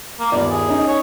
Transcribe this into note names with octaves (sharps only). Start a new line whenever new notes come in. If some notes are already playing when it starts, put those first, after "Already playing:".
A#3
G1 D#2 D5
G#4
C#4 D#4
C#5